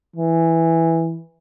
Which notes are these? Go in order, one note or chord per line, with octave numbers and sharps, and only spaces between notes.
E3